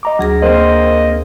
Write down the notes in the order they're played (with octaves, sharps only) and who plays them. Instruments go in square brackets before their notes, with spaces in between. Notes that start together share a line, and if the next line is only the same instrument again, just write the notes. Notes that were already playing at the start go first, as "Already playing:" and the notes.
[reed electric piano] D#5 A#5 D6
[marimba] D2 G#4 A#6 [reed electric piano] F#3
[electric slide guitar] A#3 C4 [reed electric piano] C5 [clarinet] D#5